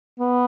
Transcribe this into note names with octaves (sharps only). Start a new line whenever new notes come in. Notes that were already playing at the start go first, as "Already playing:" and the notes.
B3